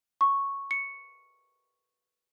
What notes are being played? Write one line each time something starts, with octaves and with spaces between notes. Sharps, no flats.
C#6
C#7